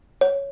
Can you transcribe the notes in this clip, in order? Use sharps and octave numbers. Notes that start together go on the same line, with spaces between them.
C#5